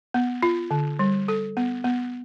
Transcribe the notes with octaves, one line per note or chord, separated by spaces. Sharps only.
B3
F4
D3
G3
A4
B3
B3